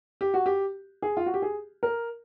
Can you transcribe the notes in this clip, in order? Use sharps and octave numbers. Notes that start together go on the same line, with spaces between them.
G4
F#4
G4
G#4
F4
F#4
G4
G#4
A#4